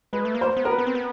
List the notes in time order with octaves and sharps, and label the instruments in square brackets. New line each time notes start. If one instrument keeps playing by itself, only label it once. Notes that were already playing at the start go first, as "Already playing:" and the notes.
[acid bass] G#3 [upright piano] B4
[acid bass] A3
A#3
[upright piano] C5
[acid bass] B3
[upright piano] A#4
B4
[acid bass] B3
C4
B3